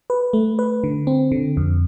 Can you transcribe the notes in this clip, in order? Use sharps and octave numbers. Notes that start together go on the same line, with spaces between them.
B4
A3
B4
D3
C4
D3
F2